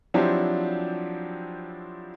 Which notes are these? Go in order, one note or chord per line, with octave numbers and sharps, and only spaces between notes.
F3 F#3 C4 D4 E4 G4